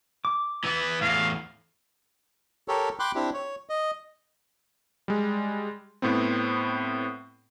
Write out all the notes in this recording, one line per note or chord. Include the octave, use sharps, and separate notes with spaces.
D6
E3 B3
E2 A2 F5
G4 A4 A#4 C#5
G5 B5 C6 D6 F#6
C4 D4 E4 G4
C#5
D#5
G3 G#3
A2 B3 C4